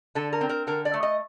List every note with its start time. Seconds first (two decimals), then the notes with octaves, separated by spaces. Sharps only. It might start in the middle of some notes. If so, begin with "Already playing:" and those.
0.15 D3 A4
0.33 A#4
0.41 C4
0.49 A#4
0.67 D3 A#4
0.85 D5
0.94 A3
1.03 D#5